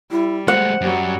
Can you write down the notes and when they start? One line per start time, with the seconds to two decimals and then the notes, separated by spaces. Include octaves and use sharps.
0.11 G3 E4
0.48 G#3 A3 C5 F#5
0.81 F#2 F#3 G3